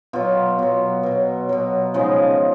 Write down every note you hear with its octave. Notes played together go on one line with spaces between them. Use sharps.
B2 F#3 F4
B2 F#3
B2 F#3
B2 F#3
C#3 F3 G#3 D#4